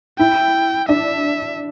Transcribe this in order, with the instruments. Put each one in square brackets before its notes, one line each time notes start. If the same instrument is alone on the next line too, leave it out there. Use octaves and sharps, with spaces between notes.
[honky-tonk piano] E4 [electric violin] G5
[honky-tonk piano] D4 [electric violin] E5